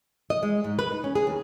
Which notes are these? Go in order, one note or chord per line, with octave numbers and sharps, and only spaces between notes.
D#5
G#3
G#2
B4
D#4
C#4
G#4
D#2